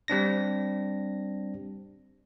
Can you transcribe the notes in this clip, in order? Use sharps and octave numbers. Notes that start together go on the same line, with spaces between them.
G3 C4 D4 A#6